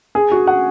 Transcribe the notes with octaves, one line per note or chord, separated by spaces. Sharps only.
G#4
F#4
F#5